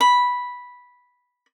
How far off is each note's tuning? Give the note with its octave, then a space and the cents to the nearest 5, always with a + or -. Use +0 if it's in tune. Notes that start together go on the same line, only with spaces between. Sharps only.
B5 -5